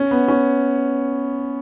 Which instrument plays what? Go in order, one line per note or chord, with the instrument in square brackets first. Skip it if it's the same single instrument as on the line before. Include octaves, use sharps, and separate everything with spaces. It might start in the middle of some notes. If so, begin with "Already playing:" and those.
Already playing: [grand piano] C#4
B3
C#4